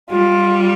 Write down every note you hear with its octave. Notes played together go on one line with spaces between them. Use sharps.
G3 F4